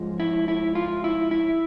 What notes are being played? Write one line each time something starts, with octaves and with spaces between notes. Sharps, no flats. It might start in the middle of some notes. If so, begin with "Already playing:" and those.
Already playing: G#2 F3 G#3
E4
E4
F4
E4
E4